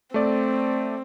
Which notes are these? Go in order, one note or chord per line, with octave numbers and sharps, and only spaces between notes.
A3 C4 D5